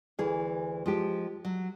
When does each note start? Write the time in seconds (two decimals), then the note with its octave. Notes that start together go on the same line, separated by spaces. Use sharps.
0.19 D2 E3 G#4
0.86 F3 G#3 G4
1.45 F#3